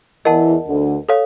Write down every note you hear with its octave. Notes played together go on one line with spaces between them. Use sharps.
E2 E3 A#4 D#5 F#5 A5
D2 D3
A4 C#5 F5